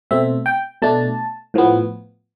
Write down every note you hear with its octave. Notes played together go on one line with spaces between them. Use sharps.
B2 A3 C4 E5
G5
B2 A3 D4 A5
A2 F3 B3